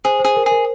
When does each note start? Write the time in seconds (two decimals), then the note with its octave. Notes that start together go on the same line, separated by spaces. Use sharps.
0.05 G#4 C5
0.19 C5
0.25 G#4
0.36 A#4
0.46 G#4 A#4